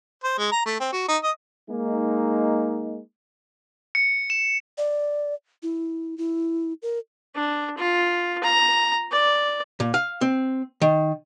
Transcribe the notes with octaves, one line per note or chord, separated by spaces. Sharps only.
C5
G#3
A#5
A3
C4
F#4
D#4
D#5
G#3 A#3 D#4
C#7
E7
D5
E4
E4
A#4
D4
F4
A#5
D5
A#2
F5
C4
D#3